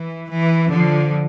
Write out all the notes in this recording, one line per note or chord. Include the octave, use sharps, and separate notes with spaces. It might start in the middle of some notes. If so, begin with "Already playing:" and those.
Already playing: E3
E3
D3 F3